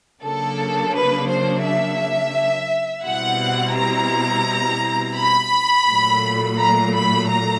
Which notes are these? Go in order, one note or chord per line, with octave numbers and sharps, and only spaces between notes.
C#3 F#3 A#3 D4 A4
B4
C5
E5
B2 G3 C4 E4 F#5
A#5
B5
A#2 F#3 A3
A#5
B5
A#5